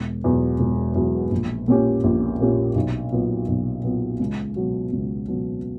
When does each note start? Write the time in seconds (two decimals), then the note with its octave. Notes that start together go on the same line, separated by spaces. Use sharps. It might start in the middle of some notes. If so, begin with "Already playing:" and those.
Already playing: E1
0.24 E2 B2 F#3
0.60 E1
0.96 E2 B2 F#3
1.31 A#1
1.68 A#2 A#3 C#4 G4
2.04 A#1
2.40 A#2 A#3 C#4 G4
2.76 B1
3.12 A#2 F#3 B3
3.48 B1
3.84 A#2 F#3 B3
4.20 C#2
4.56 B2 F#3
4.92 C#2
5.28 B2 F#3